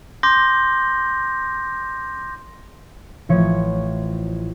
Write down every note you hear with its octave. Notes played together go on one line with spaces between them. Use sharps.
C6 D6 G6 A#6
A1 F3 E4 C#5 C#7